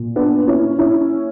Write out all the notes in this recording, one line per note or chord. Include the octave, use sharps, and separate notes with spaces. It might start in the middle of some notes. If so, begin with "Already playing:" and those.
Already playing: A#2
B3 D4
C#4 E4
C#4 E4